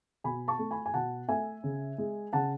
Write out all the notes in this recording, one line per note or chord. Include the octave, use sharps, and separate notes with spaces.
B2 G#5 B5
A5 C#6
A3
G#5 B5
G#5
B2 F#5 A5
A3 E5 G#5
C#3
G#3
C#3 F#5 A5